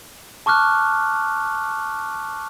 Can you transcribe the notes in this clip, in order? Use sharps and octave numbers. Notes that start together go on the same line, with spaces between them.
A5 C#6 D6 F6 F#6